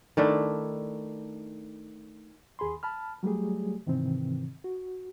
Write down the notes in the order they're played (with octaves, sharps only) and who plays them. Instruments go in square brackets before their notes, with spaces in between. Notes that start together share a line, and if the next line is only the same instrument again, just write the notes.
[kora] D#3 A3 D4 E4
[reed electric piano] D#2 G#4 B5 C6
A5 B5 F6
F#3 G3 A3 G4 G#4
G#2 C3 D#3 E3 C4
F#4